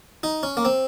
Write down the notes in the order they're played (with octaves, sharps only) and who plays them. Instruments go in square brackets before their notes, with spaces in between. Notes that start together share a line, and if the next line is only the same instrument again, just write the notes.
[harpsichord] D#4
C#4
A#3
C4